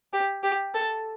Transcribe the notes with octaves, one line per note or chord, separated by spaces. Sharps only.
G4
G4
A4